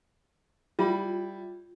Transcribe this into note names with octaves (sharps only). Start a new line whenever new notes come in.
G3 E4 F4 B5